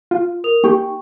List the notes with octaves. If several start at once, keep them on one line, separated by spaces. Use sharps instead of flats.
F4
A#4 D#6 F7
A#3 D#4 G4 G5 C#6